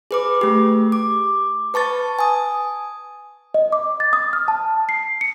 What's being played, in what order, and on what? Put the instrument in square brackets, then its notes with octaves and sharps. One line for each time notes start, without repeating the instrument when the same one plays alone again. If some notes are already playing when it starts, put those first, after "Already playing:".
[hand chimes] G#4 B4 D6
A3 G4
D6
B4 A5 C#6 A6
G#5 D#6
[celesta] D#5
D6
A6
D#6
F6
A5
C7
C#7